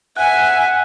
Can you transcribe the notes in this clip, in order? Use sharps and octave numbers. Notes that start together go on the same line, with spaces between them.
E5 F#5 G#5 F#6